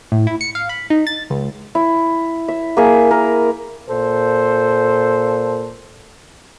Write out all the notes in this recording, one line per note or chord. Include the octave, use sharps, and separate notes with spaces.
A2
E4
C#7
F5
B5
D#4
A6
C#2
E4
E5
A#3 G#4 E5
A#4
A#2 A4 C5